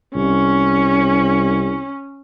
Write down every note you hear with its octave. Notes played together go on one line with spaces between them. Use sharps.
C2 C#4